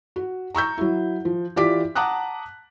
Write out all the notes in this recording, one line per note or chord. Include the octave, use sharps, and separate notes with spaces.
F#4
A#5 C#6 E6 G6
F#3 E4
F3
E3 F4 G4 D5 D6 B6
F#5 A5 A#5 D6 D#6 F#6